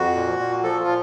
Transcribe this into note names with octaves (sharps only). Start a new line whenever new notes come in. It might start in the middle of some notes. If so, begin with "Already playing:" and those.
Already playing: F2 F#4
A#2
A#2
F3 A4
F4
A#2